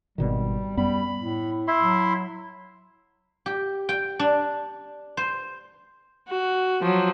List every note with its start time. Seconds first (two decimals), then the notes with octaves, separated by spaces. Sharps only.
0.18 G#1 B2 D#3 G3
0.77 F#2 G3 B3 B5
1.18 A2
1.68 E4 E5 C6
1.84 F#3
3.46 G4
3.89 G5
4.19 D4
5.17 C5
6.29 F#4
6.82 F3 F#3